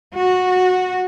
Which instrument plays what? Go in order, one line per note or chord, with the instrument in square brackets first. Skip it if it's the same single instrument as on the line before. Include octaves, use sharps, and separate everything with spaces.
[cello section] F#4